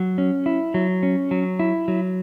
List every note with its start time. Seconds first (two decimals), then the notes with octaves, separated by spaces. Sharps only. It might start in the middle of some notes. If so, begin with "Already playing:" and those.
Already playing: F#3
0.18 C#4
0.46 E4
0.74 F#3
1.03 C#4
1.31 F#3
1.60 E4
1.88 F#3